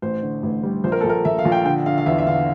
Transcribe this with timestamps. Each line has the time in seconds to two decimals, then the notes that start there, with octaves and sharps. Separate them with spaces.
0.02 A1 C5
0.22 D3
0.43 A1
0.63 G3
0.84 A#1 C5
0.92 A#4
1.01 A#1 A4
1.09 A#4
1.25 A#1 E5
1.39 F5
1.45 A#1
1.52 G5
1.65 D3 G5
1.86 D3 F5
1.98 F5
2.06 E2 E5
2.18 E5
2.27 D3 F5